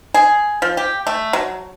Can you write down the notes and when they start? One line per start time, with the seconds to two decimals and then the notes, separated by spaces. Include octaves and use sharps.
0.14 G#4
0.62 F3
0.77 G4
1.07 A3
1.33 F#3